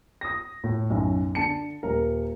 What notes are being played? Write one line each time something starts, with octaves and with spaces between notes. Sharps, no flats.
D#6 A#6
A2
B1 F#2
D3 A5 C#7
D#1 A#4